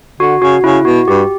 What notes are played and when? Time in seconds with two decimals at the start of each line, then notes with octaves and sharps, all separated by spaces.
0.20 D3 F#4
0.41 C#3 F#4
0.64 C#3 E4
0.85 B2 F#4
1.08 G2 G4